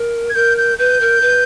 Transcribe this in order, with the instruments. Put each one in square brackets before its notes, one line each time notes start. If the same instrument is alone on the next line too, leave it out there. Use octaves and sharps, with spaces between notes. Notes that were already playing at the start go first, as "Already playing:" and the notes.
Already playing: [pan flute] A#4
[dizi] G#6
[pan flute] A#4 [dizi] G6
[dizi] G6
[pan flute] B4 [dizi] G6
[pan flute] A#4
B4